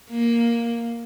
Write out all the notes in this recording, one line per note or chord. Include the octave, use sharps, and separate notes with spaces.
A#3